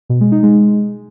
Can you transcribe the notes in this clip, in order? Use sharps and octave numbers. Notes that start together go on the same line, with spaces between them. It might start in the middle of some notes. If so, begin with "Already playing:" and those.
B2
G#3
D#4
G#3